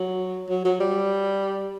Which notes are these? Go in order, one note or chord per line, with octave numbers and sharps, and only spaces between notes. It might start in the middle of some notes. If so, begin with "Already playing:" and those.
Already playing: F#3
F#3
F#3
G3